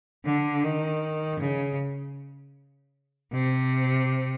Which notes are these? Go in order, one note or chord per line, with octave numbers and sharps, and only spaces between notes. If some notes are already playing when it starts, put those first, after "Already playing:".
D3
D#3
C#3
C3